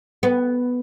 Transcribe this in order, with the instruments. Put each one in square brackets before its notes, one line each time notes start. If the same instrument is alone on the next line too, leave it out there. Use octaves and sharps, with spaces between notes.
[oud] B3